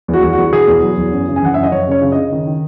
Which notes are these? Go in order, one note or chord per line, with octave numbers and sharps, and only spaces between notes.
E2
F#4
E2
E2 F#4
B2 G#4
E2
F#3
E2
F#2
C#3
G#5
E3 F#5
F#2 E5
D#5
F#2 C#5
C#3 C#5
C#3
C#3 D#5
D#3
D#3